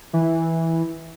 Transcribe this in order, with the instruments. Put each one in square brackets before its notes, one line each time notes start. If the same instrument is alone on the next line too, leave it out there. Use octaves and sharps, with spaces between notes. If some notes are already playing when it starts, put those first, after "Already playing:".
[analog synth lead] E3